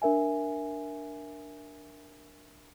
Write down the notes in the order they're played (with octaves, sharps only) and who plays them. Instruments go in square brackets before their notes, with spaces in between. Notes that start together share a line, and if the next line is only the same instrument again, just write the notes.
[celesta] D4 A#4 E5 G#5